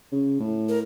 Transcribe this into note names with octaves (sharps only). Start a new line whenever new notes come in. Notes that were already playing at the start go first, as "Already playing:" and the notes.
C#3
A2
A#4